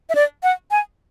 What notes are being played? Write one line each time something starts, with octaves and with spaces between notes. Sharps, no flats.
E5
D5
F#5
G#5